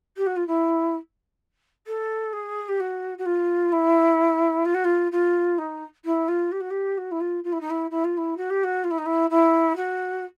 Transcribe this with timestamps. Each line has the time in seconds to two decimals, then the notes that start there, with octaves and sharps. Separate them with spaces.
0.17 G4
0.26 F#4
0.36 F4
0.47 E4
1.86 A4
2.33 G#4
2.68 G4
2.80 F#4
3.18 F#4
3.25 F4
3.72 E4
4.65 F4
4.74 F#4
4.84 F4
5.11 F4
5.58 D#4
6.04 E4
6.28 F4
6.51 G4
6.60 F#4
6.70 G4
6.97 F#4
7.11 E4
7.20 F4
7.44 F4
7.52 E4
7.60 D#4
7.70 E4
7.90 E4
8.04 F4
8.17 E4
8.37 F#4
8.50 G4
8.63 F#4
8.84 F4
8.90 E4
8.98 D#4
9.05 E4
9.30 E4
9.76 F#4